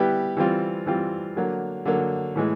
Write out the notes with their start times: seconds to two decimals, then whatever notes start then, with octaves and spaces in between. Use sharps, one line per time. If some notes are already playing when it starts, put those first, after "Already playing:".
Already playing: G3 B3 E4 G4 B4
0.37 E3 G3 C4 F4
0.86 E3 G3 C4 F4
1.36 D3 F#3 A#3
1.85 D3 F#3 A#3
2.36 A2 E3 G#3